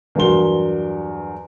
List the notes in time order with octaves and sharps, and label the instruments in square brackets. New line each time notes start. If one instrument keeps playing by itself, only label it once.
[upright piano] E2 G2 F#3 A#4 C6 G7